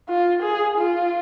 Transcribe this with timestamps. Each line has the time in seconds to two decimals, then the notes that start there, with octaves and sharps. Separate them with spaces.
0.08 F4
0.42 G#4
0.77 F4